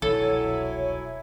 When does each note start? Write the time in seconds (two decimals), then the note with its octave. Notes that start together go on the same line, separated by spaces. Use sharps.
0.02 E1 C2 F#3 E4 A4 C#5 G#5